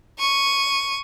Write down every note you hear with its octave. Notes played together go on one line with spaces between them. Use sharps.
C#6 D#7